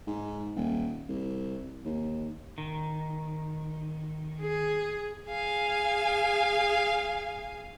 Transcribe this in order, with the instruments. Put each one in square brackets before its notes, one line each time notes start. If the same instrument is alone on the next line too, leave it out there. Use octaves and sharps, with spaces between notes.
[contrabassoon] G#2
D#1
C2
D#2
[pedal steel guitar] D#3
[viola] G#4
[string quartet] G#4 F5 G#5